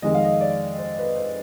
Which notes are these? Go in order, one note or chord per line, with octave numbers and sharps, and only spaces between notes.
F2 D#3 G#3 D#5
F5
D#5
D5
C5
B4
C5